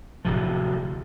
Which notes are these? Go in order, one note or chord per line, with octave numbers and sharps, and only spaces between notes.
D1 C3 F3